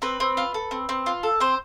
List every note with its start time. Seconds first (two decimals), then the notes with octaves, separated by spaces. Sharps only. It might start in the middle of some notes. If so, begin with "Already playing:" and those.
0.02 C4 B4
0.20 C4
0.37 F4
0.54 A4
0.71 C4
0.89 C4
1.06 F4
1.23 A4
1.40 C4 C5